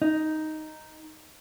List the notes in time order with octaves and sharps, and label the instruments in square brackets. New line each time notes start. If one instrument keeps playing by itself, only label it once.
[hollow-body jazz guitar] D#4